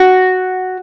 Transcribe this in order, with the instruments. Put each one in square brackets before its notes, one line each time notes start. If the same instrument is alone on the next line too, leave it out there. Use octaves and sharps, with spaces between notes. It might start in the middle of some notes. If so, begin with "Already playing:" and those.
Already playing: [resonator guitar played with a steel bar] F#4